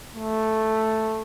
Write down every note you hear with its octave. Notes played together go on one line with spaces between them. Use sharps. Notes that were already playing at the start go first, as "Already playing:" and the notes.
A3